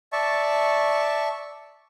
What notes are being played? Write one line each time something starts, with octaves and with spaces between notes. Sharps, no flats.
D5 E5 A5 C#6